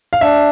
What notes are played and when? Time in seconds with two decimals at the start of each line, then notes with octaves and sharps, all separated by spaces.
0.13 F5
0.21 D4 E5